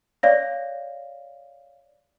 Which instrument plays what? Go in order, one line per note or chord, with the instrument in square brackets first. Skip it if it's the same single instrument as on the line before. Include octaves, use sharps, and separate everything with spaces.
[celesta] C#5 D5 F5 A#6